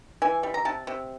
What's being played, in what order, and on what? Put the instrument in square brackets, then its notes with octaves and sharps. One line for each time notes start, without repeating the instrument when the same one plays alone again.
[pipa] E3 G#5
G3
A#5
C3 A5
C3